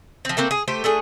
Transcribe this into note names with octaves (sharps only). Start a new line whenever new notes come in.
F3 C4
A3 A#3 C4
G#4
A3 G4 C5
A3 D4 G#4